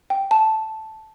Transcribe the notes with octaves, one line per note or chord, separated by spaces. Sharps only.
G5
A5